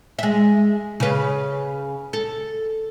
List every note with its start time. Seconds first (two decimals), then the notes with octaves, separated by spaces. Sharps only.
0.19 G#3 E5
1.00 C#3 B4
2.13 A4